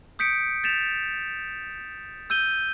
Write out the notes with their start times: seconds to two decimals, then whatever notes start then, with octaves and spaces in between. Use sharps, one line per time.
0.19 D#6 G6 B6 C#7 D7
0.63 G6 A6 B6 E7 F7
2.30 E6 G6 D#7 G7